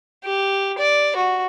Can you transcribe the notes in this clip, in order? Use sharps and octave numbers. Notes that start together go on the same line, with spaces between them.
G4
D5
F#4